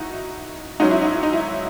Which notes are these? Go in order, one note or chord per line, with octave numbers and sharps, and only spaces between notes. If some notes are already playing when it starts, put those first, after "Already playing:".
Already playing: D#4 E4 F#4
G#2 F#3 C#4 D#4
E4
D#4
E4
D#4
E4